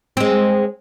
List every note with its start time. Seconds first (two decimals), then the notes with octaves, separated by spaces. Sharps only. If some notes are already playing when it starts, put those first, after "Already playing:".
0.17 G#3 C4